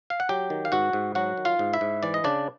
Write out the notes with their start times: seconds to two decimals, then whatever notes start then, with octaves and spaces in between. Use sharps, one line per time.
0.10 F5
0.20 F#5
0.29 F#3 G4 G5
0.50 D#3
0.65 F5
0.72 G#2 F#4 F#5
0.93 G#2
1.15 F#3 F#4 F#5
1.37 D#3
1.45 F4 F5
1.59 G#2
1.73 E4 E5
1.81 G#2
2.03 E3 D5
2.14 D#5
2.24 C#3 D4 D5